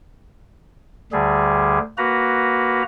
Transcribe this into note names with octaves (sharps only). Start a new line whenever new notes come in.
D2 D3 G3 G#4
A#3 F#4 B4 A#5